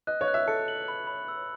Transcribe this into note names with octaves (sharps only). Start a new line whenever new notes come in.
D#5 F#6
C#5
F#6
E5
A4 C#7
F#7
B5
B5
E6